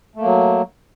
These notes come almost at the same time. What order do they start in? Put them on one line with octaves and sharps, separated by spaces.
A3 A#3 F#3